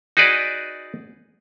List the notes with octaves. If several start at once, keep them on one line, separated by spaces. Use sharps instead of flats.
D#4 F#4 G#4 B4 D5